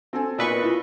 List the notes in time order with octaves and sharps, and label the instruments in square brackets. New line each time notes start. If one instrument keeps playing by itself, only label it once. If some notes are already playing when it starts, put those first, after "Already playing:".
[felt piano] C4 A4 G#5
[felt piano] B1 [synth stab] A#2 B4 C#6
[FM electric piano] E4 F4